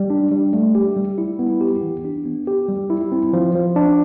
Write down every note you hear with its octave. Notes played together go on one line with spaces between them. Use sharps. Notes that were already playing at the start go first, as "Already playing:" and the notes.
Already playing: G3
D4
G3
A3
G4
G3
E4
B3
G4
E3
D4
B3
G4
G3
E4
C4
F3
F3
D4